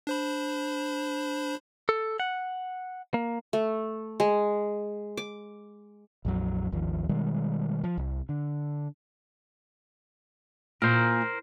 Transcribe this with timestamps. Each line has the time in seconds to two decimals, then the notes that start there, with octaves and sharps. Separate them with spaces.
0.07 D4 C5 B5
1.89 A4
2.20 F#5
3.14 A#3
3.53 A3
4.20 G#3
5.17 D6
6.25 A#1 F2 F#3
6.72 G#1 D#2 F3
7.09 B2 D#3 G3 G#3
7.84 F3
7.97 C2
8.29 D3
10.82 A#2 A#4 C5